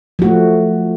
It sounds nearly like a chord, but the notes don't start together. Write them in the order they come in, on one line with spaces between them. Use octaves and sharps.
F3 F#4 A3